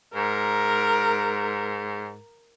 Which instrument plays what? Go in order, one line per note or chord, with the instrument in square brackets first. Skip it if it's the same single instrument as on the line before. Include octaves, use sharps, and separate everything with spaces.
[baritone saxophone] G#2 [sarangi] A#4